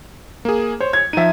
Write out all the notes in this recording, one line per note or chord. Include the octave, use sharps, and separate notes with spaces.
A#3 G#4
C5 C#5
G#6
F3 D#4 E5 D#7